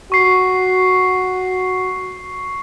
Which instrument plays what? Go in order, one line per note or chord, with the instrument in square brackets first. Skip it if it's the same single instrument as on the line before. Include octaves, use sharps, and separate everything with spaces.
[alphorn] F#4 [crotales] C#6 C7